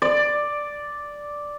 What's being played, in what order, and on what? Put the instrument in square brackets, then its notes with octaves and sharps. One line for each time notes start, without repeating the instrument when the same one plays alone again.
[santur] D5